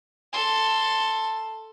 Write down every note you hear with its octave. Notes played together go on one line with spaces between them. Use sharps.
A4 C6